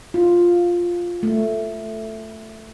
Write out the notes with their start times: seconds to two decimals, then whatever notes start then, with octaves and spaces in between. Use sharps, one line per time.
0.14 F4
1.23 A3